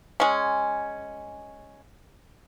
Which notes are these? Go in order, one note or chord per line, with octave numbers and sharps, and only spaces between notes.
G#3 C#4